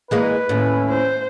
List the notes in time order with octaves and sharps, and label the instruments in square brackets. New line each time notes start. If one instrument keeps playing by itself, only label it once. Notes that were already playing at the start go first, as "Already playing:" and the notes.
[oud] E3 G#3 A#3 [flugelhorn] B4
[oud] D#2 A2 [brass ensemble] C#4 E4
[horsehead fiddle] C5